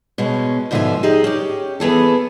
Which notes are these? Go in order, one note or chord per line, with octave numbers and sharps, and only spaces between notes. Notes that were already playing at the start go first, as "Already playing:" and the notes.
B2 G#3 C#4
G#2 B2 D3 F3 E5 G#5
D#4 G4 G#4 D#5
C#4 G4
E3 B3 G#4 A4